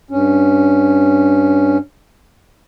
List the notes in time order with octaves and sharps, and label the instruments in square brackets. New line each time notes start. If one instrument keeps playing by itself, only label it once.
[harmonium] G2 C#4